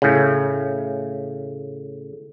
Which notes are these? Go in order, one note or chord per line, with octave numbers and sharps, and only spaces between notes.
A2 C#3